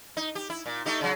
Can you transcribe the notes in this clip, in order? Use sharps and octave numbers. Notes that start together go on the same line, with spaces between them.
D#4
G4
E4
A#2
A3 D#4 G4
C#3 F#3